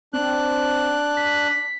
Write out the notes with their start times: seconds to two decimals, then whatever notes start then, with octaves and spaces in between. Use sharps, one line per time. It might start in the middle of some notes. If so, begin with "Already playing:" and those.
0.13 C4 D4 F#6
1.17 B6